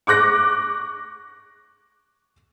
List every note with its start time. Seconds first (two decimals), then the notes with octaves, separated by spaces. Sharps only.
0.07 C#6 D6 F#6 A#6